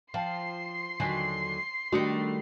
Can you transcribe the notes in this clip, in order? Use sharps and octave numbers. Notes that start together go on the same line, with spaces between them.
F3 F5 G5 A5 C6 C7
D#2 D3 F#3 G#5 B6
D#3 G3 A3 D4 F#4 D#6 C#7